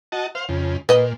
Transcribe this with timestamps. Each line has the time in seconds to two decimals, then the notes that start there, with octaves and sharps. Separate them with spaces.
0.12 F#4 D#5 A5
0.35 C5 F5
0.49 F2 C#3
0.89 A#2 B4 D#5